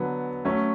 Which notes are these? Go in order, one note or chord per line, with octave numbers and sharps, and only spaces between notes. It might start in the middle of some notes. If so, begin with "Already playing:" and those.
Already playing: D3 F#3 B3
F#3 A3 C#4